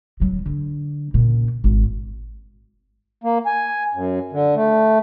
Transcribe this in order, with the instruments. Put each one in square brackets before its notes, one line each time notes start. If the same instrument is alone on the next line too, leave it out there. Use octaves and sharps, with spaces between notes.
[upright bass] D1 F#3
D3
A#2 C#3
G#1
[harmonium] A#3
G#5
F#2
D3
A3